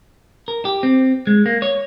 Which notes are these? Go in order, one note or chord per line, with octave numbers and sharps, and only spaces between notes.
A#4
G4
C4
G#3
A#3
C#5